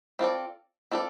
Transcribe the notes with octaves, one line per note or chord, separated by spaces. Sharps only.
C4 F4 A4 D5
C4 F4 A4 D5